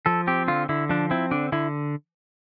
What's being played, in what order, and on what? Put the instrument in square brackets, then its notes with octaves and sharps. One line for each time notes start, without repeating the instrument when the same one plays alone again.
[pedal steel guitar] F3 A4
C4 G4
D3 F4
D3 E4
F3 D4
C4 E4
D3 D4
D3 E4